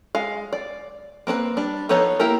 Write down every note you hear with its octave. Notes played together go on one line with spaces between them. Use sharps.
G#3 F5
D5
A#3 C4 D4 B4
G3 D4
F3 B3 D#4 A4 C#5
A#3 E4 G4 A#4